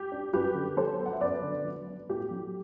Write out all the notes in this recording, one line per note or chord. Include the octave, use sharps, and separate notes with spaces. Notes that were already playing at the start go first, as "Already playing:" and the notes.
Already playing: G4
D4
F#2 G4 B4
D3
F#3 A4 C5
B3
F#5
E5
F#2 B4 D5
D3
F#3
B3
A2 G4
F#3